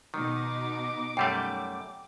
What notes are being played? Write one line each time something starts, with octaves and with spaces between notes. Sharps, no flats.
B2 D#3 D#4 D6
F#2 G3 A3 G5